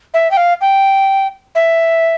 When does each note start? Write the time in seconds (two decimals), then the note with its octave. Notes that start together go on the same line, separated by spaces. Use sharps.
0.14 E5
0.31 G5
0.37 F5
0.61 G5
1.55 E5